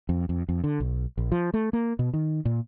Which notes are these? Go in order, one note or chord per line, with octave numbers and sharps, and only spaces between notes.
F2
F2
F2
D3
B1
A#1
F3
A3
A#3
B2
D#3
A#2